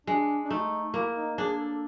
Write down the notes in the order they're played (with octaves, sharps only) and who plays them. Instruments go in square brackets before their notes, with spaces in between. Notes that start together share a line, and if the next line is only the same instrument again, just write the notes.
[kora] G#3 [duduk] D4
[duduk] D4
[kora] A3 [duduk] D#4
[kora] A#3 [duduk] E4
[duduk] D#4
[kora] D4 [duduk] G#4
[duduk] A4